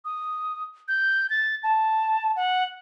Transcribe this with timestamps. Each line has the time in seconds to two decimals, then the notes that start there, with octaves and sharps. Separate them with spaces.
0.05 D#6
0.88 G6
1.30 A6
1.64 A5
2.36 F#5